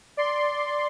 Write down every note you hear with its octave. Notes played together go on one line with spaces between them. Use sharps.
D5 C6